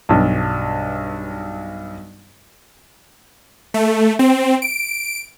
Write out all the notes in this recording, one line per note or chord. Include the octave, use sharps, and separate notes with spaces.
B1 G2
A3
C4
D7